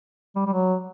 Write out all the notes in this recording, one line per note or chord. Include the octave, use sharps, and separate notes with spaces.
G3
G3
F#3